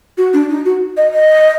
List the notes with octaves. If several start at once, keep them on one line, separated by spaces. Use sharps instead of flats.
F#4
D4
D#4
F#4
D#5
D#5